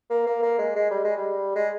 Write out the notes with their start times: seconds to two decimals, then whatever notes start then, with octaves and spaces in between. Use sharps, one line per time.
0.10 A#3
0.27 A#3
0.42 A#3
0.58 G#3
0.75 G#3
0.91 G3
1.04 G#3
1.17 G3
1.56 G#3